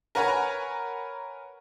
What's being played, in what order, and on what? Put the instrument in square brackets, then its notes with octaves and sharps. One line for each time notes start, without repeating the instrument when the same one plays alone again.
[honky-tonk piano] A#4 B4 C#5 F#5 G#5 A#5